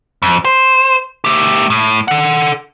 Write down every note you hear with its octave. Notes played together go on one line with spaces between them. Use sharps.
F2
C5
A3 G4
A2
A4 F#5